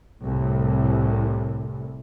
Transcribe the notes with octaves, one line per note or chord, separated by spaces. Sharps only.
C2 A2